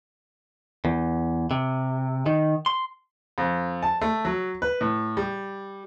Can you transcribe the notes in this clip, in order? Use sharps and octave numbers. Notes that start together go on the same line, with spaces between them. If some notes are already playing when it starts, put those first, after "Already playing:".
E2
C3
D#3
C6
F2
A5
A3
F#3
B4
A2
G3